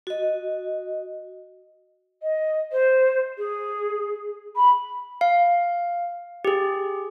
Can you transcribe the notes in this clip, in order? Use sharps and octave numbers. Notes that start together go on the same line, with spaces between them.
F#4 D#5
D#5
C5
G#4
B5
F5
G4 G#4